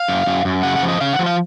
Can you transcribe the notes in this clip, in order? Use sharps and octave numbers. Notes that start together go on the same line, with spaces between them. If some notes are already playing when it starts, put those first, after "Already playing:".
Already playing: F5
F#2
F#2
F#2
C#3 F#5
F#5
F3
D#5
C#3 F5
F#5
F3
F5